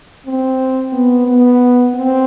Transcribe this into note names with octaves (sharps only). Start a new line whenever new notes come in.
C4
B3
B3
C4